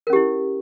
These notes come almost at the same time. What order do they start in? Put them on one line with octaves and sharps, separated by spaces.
A#4 C#4 G4 E4